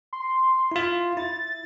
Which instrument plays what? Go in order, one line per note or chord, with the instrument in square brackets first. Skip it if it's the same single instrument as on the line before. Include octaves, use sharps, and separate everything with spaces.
[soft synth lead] C6
[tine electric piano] E4 F4
[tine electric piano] E4 [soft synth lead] A6